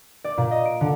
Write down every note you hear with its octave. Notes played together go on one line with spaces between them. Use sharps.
D5
A#2
D#5
D7
D3